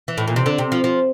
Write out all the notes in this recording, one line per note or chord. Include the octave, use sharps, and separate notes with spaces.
E3
A2
A#2
C3
D3
C3
F3
F3